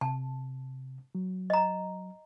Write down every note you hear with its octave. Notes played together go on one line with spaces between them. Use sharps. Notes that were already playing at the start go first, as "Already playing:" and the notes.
C3 A5
F#3
D#5 A#5